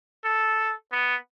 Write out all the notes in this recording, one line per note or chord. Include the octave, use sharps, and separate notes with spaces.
A4
B3